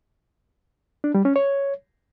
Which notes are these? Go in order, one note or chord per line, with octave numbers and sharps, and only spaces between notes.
D4
G3
C#4
C#5